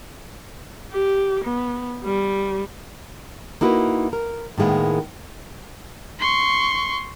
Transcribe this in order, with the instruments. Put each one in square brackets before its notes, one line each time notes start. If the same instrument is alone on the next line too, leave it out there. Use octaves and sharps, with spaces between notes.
[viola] G4
B3
G3
[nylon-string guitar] A#3 D#4 E4 F#4 A#4 B4
A#4
A2 D#3 G#3 A#3 B3
[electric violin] C6 C#6